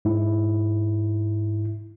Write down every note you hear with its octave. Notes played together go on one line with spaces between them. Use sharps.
G#2 E4